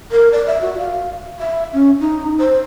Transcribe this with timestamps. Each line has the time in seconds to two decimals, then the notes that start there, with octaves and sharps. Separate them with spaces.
0.11 A#4
0.32 D5
0.47 E5
0.62 F#4
0.78 F5
1.40 E5
1.73 C#4
2.00 D#4
2.39 C5